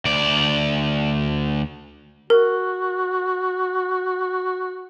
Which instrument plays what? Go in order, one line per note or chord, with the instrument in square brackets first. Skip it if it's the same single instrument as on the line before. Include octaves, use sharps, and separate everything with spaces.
[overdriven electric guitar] D2 D5
[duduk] F#4 [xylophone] A#4